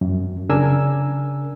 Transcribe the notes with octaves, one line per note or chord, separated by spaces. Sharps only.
F#2
C#3 D4 A#4 G#5 E6